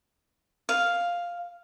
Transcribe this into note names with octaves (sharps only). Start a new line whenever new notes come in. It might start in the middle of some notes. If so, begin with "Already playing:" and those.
F5